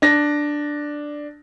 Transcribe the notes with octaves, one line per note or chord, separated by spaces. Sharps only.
D4 A#6